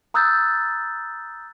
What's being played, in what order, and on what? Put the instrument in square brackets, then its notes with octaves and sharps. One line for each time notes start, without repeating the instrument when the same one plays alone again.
[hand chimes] A#5 D#6 E6 F#6 G6 A6